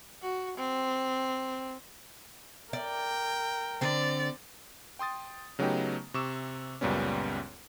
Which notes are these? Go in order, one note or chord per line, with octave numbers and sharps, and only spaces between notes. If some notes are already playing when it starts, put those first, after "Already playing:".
F#4
C4
A#4 D5 G5
D3 C4 D5
G5 C6 D#6 A6
C#3 F#3 A3 B3 D#4 G4
C3 C#6 D6 E6 E7
C#2 F#2 A#2 G3 B3 C#4